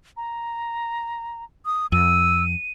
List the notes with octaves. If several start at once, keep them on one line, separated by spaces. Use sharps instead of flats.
A#5
D#6
F2 E6 D#7